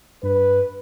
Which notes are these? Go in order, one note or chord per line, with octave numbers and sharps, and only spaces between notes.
G2 B4